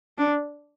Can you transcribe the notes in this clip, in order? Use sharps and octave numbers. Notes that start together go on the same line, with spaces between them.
D4